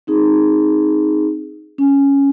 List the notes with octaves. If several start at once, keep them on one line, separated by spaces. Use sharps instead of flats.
C4 D#4 G#4
C#4